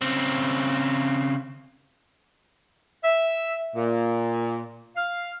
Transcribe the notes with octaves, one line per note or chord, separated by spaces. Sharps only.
C#3 C4
E5
A#2
F5